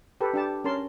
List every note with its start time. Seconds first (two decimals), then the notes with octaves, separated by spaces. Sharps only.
0.21 G4 A4 B4
0.34 D4 G4 A5
0.64 C#4 A#4 A5 C6